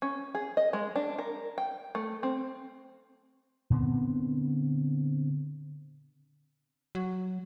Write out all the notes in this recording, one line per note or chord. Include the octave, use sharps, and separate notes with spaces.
C#4
G#4
D#5
G#3
D4
A#4
G5
A3
C4
A#2 D3 B3 C4
F#3